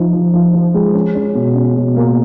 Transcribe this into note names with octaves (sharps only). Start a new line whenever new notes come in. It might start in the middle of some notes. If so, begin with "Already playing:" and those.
Already playing: F3 D#4
F3
F3
F3
G#3
C#4
C#4
B2
C#4
B2
A#3